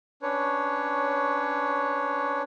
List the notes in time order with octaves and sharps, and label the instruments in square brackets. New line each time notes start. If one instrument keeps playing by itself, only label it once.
[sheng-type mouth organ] C#4 D4 B4 C#5